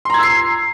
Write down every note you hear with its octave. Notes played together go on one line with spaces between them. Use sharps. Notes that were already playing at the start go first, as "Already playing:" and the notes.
A#5 C6 E6 G#6 C7